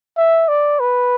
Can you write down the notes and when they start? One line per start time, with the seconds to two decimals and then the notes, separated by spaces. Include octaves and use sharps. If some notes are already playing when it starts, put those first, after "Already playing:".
0.17 E5
0.48 D5
0.80 B4